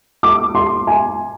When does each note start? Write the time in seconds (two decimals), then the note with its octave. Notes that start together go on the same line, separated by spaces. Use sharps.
0.23 D6
0.55 C6
0.87 G#5